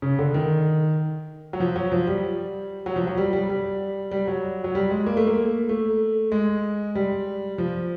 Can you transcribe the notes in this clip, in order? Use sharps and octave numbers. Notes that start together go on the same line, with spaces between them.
C#3
D3
D#3
F#3
F3
F#3
F3
G3
F#3
F3
F#3
G3
G3
G3
G3
F#3
F#3
G3
G#3
A#3
A3
A#3
A3
G#3
G3
F3